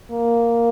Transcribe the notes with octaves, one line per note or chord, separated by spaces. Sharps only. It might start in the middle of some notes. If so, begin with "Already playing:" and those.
A#3